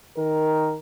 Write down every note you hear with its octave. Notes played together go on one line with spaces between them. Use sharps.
D#3 A#4